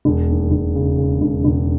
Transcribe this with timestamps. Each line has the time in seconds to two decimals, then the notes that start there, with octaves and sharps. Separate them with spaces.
0.05 E1
0.29 D#2
0.51 E1
0.75 C#3
0.97 C#3
1.21 E1
1.44 E1